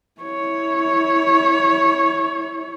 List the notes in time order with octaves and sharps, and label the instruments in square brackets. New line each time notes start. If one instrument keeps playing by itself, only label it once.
[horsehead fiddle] E4 C#5